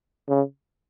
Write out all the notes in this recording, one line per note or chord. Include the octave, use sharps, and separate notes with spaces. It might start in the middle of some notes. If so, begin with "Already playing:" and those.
C#3